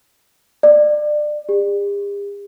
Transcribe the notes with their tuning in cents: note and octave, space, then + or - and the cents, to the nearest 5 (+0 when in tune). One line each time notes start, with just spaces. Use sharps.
D5 +25
G4 +45